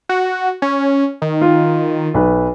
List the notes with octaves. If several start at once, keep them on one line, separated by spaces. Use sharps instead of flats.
F#4
C#4
D#3
F4
B1 B4